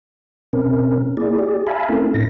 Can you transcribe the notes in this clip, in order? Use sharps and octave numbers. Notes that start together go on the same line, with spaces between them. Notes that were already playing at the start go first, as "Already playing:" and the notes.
B2 C4 C#4 A#4
A#3 E4 G#4 D5
G4 G#4 D5
E5 F5 G#5 A5 B5
A3 C4 C#4 E4 A4 A#4
A2 D#4 A#6